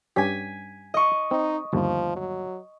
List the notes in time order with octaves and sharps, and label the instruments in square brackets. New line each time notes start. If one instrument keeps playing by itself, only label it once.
[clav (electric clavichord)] G2 C#4 G4 [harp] G#5 B6
[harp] D#5 C#6
[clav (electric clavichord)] C4 [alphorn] D#4
[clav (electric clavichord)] G1 D#2 [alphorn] F3
[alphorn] F#3